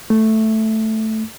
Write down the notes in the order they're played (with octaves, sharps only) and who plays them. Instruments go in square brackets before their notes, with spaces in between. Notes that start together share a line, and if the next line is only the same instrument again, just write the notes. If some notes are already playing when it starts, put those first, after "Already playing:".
[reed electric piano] A3